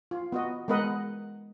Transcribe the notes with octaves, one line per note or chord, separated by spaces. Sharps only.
F4
B3 F#4 D#5
G#3 B3 A#4 B4 D#5 F#5